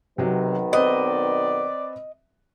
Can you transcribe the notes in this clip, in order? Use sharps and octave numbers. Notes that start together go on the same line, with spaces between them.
B1 C3 D#3 F#3 B3
C4 B4 D5 D#5